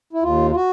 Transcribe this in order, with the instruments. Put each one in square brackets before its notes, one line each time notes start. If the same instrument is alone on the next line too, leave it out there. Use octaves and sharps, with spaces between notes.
[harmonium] E4
D#2 F4
F4
F#4